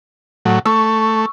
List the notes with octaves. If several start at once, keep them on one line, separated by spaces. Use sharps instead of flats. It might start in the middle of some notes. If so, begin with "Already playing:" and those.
A2 F#3
A3 C#6 E6